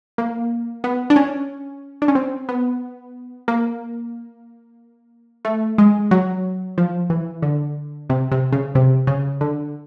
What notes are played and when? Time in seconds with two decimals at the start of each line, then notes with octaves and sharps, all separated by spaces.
0.18 A#3
0.84 B3
1.10 D4
1.16 C#4
2.02 D4
2.08 C#4
2.15 C4
2.49 B3
3.48 A#3
5.45 A3
5.78 G#3
6.11 F#3
6.78 F3
7.10 E3
7.42 D3
8.10 C3
8.32 C3
8.52 C#3
8.75 C3
9.07 C#3
9.41 D3